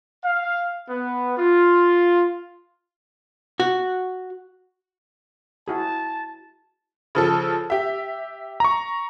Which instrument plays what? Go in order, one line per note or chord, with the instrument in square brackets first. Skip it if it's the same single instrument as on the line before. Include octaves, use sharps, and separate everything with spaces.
[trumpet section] F5
B3
F4
[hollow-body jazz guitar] F#4
[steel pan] E4 F#4 G#4 [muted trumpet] A5
[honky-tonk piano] C#3 F3 A4
G4 E5
[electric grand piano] A#5 C#6